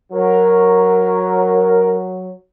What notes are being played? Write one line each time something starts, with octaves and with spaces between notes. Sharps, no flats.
F#3 A#4